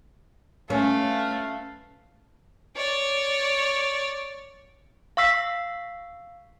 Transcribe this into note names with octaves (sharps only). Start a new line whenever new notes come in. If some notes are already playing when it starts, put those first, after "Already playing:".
A3 C#4 F4 B4 F5
C#5 D5
F5 C#6 E6 B6 C7